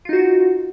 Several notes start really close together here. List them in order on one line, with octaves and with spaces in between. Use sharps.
F4 D#4 F#4